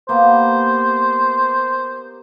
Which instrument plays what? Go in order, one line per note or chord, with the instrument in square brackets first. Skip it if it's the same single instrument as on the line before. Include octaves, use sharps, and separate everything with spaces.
[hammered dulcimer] A#3 B3 G4 [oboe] C5